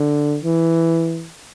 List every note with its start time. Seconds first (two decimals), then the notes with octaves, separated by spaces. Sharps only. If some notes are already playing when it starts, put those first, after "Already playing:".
Already playing: D3
0.44 E3